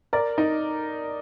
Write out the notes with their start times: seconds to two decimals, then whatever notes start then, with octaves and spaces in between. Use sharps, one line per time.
0.13 A#4 D5
0.38 D#4